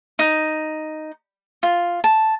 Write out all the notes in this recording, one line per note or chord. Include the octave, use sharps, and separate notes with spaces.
D#4
F4
A5